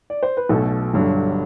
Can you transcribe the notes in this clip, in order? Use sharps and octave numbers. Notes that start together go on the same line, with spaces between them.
D5
C5
B4
B1 B2 A3 A4
G1 G2 F#3